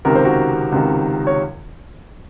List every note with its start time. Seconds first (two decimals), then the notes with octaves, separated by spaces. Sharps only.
0.05 C#2 C3 D#3 A#4
0.15 C5
0.25 F#4 A#4
0.72 C#2 C3 D#3
1.27 C#5